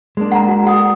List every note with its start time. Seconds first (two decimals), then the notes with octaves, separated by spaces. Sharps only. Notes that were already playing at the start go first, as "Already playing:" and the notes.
0.17 G#3 A#3 D4
0.32 F#5 A5 A#5
0.48 F#4 F#5
0.65 G#4 F#5 D#6